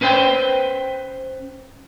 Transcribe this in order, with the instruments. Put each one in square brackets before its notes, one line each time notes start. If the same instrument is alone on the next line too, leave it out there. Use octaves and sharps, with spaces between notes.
[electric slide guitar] C#4 B4 C5 F#5 G5